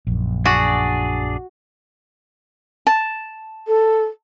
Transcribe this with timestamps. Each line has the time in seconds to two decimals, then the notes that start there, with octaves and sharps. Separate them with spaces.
0.07 A#1 F#2
0.45 D4 F#4 G#4 D5
2.87 A5
3.67 A4